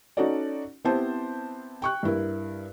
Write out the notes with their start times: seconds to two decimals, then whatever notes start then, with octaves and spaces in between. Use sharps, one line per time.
0.17 C#4 D#4 F#4 A4 C#5 D5
0.85 B3 C4 E4 G4 C5 A5
1.82 G5 C#6 F#6
2.03 G2 E4 A#4